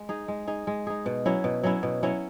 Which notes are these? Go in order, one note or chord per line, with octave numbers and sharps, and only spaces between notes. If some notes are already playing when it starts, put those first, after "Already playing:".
Already playing: G#3
D#4 G#4
G#3
D#4 G#4
G#3
D#4 G#4
B2
F#3 C#4 E4
B2
F#3 C#4 E4
B2
F#3 C#4 E4